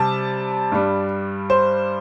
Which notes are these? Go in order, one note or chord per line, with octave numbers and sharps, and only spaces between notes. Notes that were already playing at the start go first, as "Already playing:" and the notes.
Already playing: C3 G3 A5
G2 G3
C5